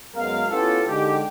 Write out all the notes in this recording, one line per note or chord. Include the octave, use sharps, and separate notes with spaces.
F#2 G#3 B3 A#4 F5
B3 C#4 E4 F4 G4 A4
D3 G#3 D#4 G4